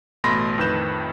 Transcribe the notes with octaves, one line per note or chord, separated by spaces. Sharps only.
A1 B2 A3 B5 C6 A#6
F2 A2 D#3 B4 G6 E7